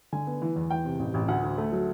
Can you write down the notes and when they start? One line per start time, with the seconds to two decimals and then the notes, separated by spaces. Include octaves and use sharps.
0.12 D3 G#5
0.27 B3
0.42 E3
0.56 E2
0.70 E3 G5
0.85 C3
0.99 A1
1.14 A1
1.28 D2 F#5
1.43 D2
1.58 A3
1.72 F#3